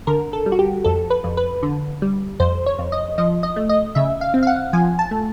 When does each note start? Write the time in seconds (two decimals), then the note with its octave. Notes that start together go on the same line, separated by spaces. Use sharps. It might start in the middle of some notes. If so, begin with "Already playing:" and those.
0.07 D3 A#4
0.33 A4
0.46 G3
0.52 F#4
0.59 G4
0.84 F2 A4
1.10 B4
1.24 F2
1.37 B4
1.63 D3
2.02 G3
2.40 F2 C5
2.66 C#5
2.79 F2
2.92 D#5
3.18 F3 D#5
3.43 D#5
3.56 A3
3.69 D#5
3.95 C#3 E5
4.21 F5
4.34 C4
4.43 F5
4.47 F#5
4.73 F3 G#5
4.99 A5
5.11 A3